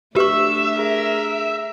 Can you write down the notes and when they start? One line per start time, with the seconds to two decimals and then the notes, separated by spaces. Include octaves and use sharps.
0.16 A3 D4 G4 B4 E5 C#6
0.74 G#4 A#4